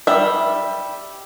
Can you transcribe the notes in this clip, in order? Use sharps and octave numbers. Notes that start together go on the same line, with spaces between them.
G3 E5